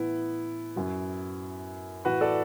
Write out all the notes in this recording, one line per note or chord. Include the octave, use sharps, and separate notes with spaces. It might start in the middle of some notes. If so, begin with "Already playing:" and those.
Already playing: A2 E3 B3 E4
F#2 F#3
A2 E3 F#4 B4
A4 D5